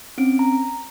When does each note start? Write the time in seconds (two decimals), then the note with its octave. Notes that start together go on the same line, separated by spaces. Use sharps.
0.18 C4 C#4 D7
0.39 A#5